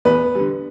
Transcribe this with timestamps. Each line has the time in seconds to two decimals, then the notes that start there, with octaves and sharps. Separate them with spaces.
0.05 E2 B3 B4
0.35 D3 G3